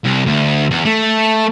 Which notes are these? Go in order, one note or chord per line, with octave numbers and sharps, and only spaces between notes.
C2
D2
E2
A3